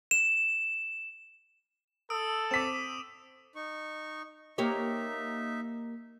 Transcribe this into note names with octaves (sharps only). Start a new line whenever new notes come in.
E7
A4 D#6 E6 D7
C4 D6 B6 D#7 E7
D#4 C#6
A#3 D#4 G4 C#5 E5